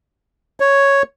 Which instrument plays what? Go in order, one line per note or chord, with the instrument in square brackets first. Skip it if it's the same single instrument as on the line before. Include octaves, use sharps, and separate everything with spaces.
[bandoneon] C#5